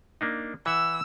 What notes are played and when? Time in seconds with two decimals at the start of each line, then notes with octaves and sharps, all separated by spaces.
0.21 A#3 D4 D#4
0.66 E3 E5 F#5 E6